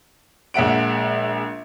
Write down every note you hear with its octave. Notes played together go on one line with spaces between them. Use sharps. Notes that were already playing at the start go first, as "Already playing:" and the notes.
A#1 G#3 E5 F#5 D7